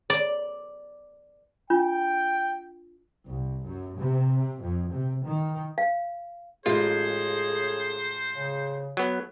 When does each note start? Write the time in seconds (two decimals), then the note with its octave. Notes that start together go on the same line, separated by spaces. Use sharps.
0.10 D5
1.70 D4 F4 G5
3.24 C2
3.64 F#2
3.97 C3
4.60 F2
4.92 C3
5.25 D#3
5.78 F5
6.66 A1 A2 C#3 G#3 F4 G#4 C5
8.35 C#3
8.97 F#3 B3